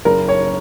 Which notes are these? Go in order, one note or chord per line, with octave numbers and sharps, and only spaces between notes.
F#1 A#4
C#5